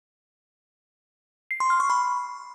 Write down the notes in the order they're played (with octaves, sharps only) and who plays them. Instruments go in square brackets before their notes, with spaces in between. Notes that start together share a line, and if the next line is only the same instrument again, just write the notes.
[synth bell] C7
C6
F6
C#6
B5